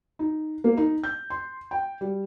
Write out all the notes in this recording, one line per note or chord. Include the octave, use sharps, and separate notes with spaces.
D#4
A#3
D#4
G6
C6
G5
G3